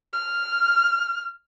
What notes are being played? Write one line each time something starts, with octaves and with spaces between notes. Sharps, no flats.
F6